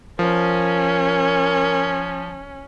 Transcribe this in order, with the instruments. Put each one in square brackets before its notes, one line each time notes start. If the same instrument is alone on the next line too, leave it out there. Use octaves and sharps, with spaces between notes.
[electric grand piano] F3 [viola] C#4 [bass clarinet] A#4